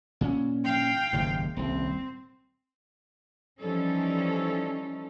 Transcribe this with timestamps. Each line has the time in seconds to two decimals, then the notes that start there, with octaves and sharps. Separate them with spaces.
0.21 A#2 C#4
0.65 F5 G5
1.13 F#1 D#2 G#2
1.57 D#1 C2 C4
3.60 E3 F3 G3 C#4 D#4 A4